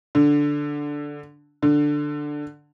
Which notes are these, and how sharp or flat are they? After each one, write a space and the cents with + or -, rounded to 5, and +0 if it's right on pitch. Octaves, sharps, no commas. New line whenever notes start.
D3 -5
D3 +5